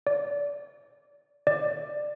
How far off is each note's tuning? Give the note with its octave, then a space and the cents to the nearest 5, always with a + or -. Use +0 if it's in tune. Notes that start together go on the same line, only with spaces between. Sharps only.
D5 -25
D5 +15